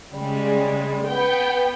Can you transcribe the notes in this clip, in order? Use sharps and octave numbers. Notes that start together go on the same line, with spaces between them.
C#3 G3 G#3
B3 G5